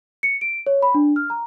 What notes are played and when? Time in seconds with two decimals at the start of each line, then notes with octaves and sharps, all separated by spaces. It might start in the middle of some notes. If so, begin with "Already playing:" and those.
0.23 C#7
0.41 D7
0.67 C#5
0.82 B5
0.94 D4
1.16 F6
1.30 A#5